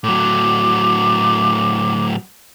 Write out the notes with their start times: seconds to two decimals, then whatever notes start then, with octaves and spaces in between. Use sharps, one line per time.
0.04 A2 F#3 D6